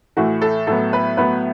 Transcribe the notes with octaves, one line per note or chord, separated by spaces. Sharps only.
A2 E3 A3 F#4
A4
A2 F#3 B3 A4
B4
A2 F#3 B3 B4